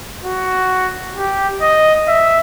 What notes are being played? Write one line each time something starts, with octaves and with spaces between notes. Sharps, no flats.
F#4
G4
D#5
E5